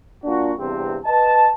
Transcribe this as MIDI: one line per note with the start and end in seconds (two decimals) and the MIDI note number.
0.24 0.52 46
0.24 0.52 62
0.24 0.52 65
0.24 0.52 66
0.57 0.97 40
0.57 0.97 43
0.57 0.97 48
0.57 0.97 60
1.05 1.49 71
1.05 1.49 75
1.05 1.49 81